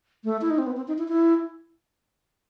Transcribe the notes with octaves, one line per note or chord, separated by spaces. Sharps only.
A3
E4
D#4
C4
B3
C4
D#4
E4
E4